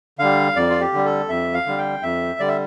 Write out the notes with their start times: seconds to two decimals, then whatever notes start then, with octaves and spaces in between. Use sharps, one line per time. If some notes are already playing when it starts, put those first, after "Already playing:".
0.19 D3 G3 F5
0.56 F2 D5
0.70 F4
0.80 G4
0.93 D3 G3
1.05 A4
1.29 F2 E5
1.54 F5
1.66 D3 G3
1.78 G5
2.03 F2 E5
2.39 D3 G3 D5
2.48 E5